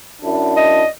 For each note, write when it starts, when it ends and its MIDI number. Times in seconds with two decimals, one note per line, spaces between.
0.22 0.81 42
0.22 0.81 62
0.22 0.81 64
0.57 0.88 75